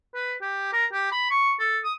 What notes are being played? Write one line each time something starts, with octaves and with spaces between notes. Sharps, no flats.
B4
G4
A#4
G4
B5
C#6
A4
D#6